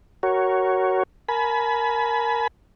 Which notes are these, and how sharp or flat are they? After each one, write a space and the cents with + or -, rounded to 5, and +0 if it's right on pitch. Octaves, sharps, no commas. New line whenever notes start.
F#4 +20 A#4 +0 C#5 +0
A#4 +0 G#5 +40 B5 +0